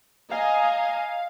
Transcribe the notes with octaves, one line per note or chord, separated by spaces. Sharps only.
D#5 F5 G#5 A#5